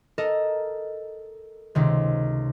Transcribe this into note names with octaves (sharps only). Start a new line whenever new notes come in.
A4 A#4 D#5
C#2 C3 D#3